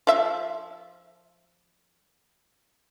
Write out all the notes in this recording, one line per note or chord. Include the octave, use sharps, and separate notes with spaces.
F3 E5